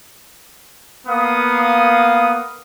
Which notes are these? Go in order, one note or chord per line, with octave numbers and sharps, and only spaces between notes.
A#3 B3 F5 D#6